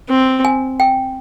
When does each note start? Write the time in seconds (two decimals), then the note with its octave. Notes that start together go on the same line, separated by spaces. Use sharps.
0.09 C4
0.45 G#5
0.80 G5